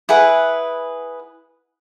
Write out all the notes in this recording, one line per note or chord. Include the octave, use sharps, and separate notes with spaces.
E4 G#4 B4 F#5